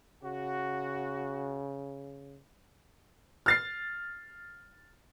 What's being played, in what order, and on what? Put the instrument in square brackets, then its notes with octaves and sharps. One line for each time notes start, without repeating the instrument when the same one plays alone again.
[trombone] C#3 [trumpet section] F#4
[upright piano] F6 A6 C7